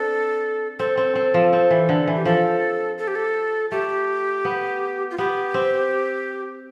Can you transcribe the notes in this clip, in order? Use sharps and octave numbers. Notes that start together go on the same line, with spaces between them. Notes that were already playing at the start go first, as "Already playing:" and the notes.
Already playing: C4 D4 A4
C4 A4
C4
C4
F3
C4
E3
D3
E3
G4
F3 A4
A4
G4
A4
A3 G4
B3
F4
B3 G4
C4